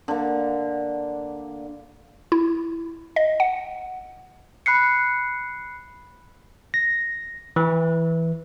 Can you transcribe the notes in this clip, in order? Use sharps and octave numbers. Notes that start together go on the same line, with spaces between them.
D3 A#3
E4
D#5
F#5
B5 F#6 C7 C#7
A#6
E3